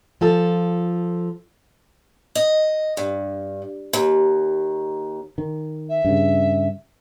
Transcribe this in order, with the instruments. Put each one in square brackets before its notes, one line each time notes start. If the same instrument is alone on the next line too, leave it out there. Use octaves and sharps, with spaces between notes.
[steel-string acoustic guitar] F3 F4 A4
D#5
G2
D#2
[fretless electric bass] D#3
[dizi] E5
[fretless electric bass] G2 C#3